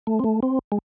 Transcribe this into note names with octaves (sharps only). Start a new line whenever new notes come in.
A3
C4
A3
C4
G#3